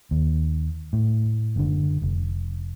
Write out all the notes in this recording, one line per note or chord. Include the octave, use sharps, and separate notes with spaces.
D#2
A2
F#1 D3
F1